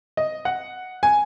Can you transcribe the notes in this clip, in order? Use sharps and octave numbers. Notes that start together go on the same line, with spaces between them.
D#5
F#5
G#5